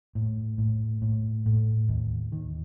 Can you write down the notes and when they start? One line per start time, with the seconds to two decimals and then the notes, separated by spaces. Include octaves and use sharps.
0.15 A2
0.58 A2
1.02 A2
1.46 A2
1.89 D#2
2.32 D#3